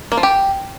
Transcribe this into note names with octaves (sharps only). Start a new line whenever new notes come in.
A#3
F3
G4